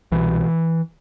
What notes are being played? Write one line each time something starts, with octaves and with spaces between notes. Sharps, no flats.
C2 B2 E3